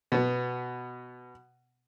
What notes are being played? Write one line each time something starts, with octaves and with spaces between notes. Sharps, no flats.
B2 B3